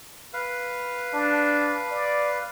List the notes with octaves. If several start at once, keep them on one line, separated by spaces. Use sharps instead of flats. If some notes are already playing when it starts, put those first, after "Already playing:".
B4 F5
D4
D5